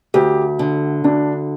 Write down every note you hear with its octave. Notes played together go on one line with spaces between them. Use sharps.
D2 G4
D3
D2 D4